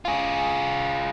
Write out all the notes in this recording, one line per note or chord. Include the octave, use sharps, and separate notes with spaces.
F4 G#4